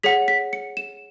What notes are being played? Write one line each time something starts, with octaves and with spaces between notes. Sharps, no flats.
G#4 C#5 F#5 B6
B6
C#7
E7